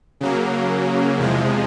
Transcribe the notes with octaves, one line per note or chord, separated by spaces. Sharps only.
C#3 F#3 A#3
E2 C3 F3 G#3